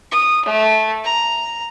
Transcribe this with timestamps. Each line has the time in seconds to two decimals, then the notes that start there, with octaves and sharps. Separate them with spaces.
0.12 D#6
0.46 A3
1.04 A#5